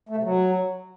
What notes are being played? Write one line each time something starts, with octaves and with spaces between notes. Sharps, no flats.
A3
C3
F#3